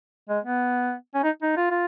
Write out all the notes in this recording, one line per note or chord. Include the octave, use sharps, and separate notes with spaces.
G#3
B3
C#4
D#4
D#4
F4
F4